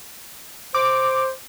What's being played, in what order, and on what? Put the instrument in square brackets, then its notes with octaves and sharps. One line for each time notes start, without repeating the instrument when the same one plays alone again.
[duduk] C5 [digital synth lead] D6